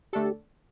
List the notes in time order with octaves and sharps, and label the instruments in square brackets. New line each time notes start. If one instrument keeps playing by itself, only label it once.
[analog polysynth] D3 A3 D4 A4 [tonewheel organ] G4